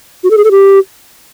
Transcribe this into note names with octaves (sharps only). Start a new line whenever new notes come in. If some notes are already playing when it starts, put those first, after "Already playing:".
F#4
A4
G#4
A4
G4